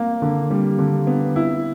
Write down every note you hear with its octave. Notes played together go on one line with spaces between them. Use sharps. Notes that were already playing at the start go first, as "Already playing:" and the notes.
Already playing: A#3
D3
G3
D3
B3
E4